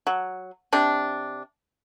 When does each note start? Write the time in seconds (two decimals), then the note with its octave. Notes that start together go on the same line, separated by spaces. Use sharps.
0.07 F#3
0.73 C3 D4